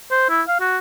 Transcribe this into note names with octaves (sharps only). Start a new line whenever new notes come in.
C5
E4
F5
F#4